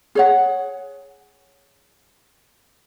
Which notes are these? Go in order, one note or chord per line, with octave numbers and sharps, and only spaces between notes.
G#4 C#5 F#5